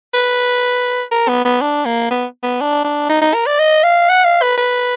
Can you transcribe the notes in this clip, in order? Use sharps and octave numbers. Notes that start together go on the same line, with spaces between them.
B4
A#4
B3
B3
D4
A#3
B3
B3
D4
D4
D#4
D#4
A#4
D5
D#5
F5
F#5
F5
B4
B4